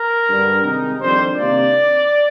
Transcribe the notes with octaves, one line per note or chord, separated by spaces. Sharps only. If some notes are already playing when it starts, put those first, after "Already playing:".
Already playing: A#4
G2 D3 G3
C3 D#3 G#3 D#4
F2 D#3 G3 D4 C5
C3 D#3 A#3 D4 D5